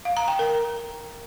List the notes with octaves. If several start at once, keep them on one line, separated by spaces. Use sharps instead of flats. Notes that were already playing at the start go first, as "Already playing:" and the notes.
F5
A#5
G5
A#4